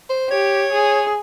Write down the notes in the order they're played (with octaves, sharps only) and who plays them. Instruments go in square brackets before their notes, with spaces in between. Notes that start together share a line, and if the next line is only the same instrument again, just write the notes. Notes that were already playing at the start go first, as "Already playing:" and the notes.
[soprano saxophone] C5
[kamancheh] G4 [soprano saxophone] C#5
[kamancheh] G#4